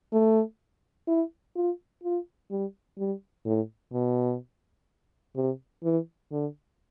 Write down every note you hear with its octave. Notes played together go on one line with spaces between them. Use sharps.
A3
E4
F4
F4
G3
G3
A2
B2
C3
E3
D3